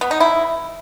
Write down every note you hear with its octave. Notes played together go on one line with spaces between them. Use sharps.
B3
D#4
E4